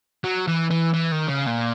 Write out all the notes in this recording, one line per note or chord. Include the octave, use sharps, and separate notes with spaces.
F#3
E3
E3
E3
D#3
C#3
A#2